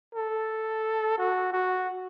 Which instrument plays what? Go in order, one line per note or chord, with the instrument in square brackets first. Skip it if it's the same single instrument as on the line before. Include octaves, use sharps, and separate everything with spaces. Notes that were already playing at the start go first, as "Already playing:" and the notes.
[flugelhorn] A4
F#4
F#4